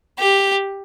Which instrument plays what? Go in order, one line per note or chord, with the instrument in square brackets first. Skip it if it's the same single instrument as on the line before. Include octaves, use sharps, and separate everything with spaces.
[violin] G4